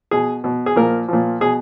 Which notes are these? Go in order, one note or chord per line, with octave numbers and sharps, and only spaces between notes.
B2 G#4
B2
G#4
A#2 F3 A#4
A#2 F3
B2 G#4